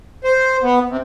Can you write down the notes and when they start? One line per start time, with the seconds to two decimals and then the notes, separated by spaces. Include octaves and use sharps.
0.24 C5
0.63 B3
0.89 C3